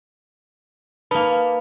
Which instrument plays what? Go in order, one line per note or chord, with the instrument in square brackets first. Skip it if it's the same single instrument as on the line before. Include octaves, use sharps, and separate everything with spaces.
[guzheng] A#3 D#4 [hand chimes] B4 A5 B5